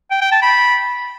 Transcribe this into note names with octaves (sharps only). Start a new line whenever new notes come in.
G5
G5
A5
B5